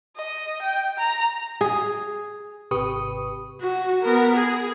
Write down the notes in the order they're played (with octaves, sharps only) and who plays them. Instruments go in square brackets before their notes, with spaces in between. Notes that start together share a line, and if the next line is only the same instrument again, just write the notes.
[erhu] D#5
G5
A#5
[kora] G#4
[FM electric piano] G#1 C3 G4 B4 C#6 D#6
[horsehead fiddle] F#4
B3 A#4
G#4